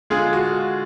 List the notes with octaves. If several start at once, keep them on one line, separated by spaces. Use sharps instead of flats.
D3 G#3 F4 G#4
F#4